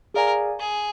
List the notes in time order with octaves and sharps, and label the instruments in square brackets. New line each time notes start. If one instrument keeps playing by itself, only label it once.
[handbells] G#4 D5 F5 G#5 [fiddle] A#4
[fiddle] G#4